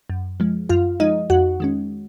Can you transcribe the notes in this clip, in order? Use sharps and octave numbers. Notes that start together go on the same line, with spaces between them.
F#2
F3 G#3
F#2 F4 F5
F3 G#3 D#4 D#5
F2 F#4 F#5
D#3 G#3 C#4